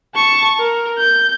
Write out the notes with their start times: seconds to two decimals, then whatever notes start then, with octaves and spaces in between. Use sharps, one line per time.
0.15 A5 C#6
0.59 A#4
0.98 G6